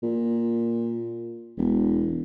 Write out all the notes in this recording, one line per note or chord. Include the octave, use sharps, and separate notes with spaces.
A#2
E1